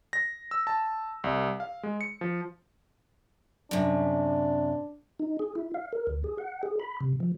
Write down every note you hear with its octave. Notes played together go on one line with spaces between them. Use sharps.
A#6
E6
A5
C2
F5
G#3
C#7
F3
F#2 C3 D4
D#4
G#4
E4
F5
A#4
D2
G#4
F#5
G#4
B5
C3
F3